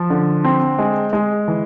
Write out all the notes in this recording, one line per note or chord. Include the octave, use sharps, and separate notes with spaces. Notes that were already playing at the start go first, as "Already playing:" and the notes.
Already playing: F3
D3
C4
G#3
G#3
E3